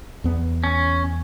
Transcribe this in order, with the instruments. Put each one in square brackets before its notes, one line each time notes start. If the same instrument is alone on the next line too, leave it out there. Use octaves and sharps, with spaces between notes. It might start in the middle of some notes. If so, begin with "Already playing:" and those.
[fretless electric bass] E2 B3
[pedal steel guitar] C#4